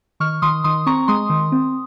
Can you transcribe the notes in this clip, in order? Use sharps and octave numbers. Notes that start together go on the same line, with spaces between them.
D#3 C#6 F6
D#3 C6 D#6
D#3 C6 D#6
C4 A#5 C#6
G#3 C6 D#6
D#3
C4